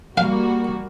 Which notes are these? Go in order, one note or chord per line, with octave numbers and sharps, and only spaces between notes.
G3 A#3 F#4 F5